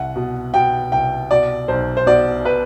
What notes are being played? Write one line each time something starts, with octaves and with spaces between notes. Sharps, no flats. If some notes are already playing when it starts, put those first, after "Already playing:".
Already playing: C2 F#5
B2
B2 G5
C2 G5
B2 D5
B1 C5
C5
B2 D5
B4